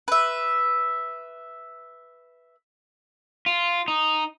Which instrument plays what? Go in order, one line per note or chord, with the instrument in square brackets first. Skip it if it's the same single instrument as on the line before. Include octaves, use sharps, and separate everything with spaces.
[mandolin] B4 E5
[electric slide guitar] F4
D#4